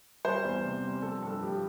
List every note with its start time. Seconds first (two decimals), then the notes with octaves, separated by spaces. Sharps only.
0.25 G3 C5
0.44 E2
0.64 C3
0.83 G3
1.02 F3 A4
1.22 G2 A4
1.42 F3 G4